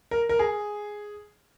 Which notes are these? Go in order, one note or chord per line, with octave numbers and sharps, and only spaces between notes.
A#4
A#4
G#4